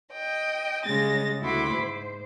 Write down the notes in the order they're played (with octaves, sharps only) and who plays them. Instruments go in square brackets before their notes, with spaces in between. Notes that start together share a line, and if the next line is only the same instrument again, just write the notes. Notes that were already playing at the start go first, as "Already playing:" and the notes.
[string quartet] D#5 G5
C#3 G3 G#3 A6 A#6
D2 E4 F#4 B5 C6 D6
G#2 C5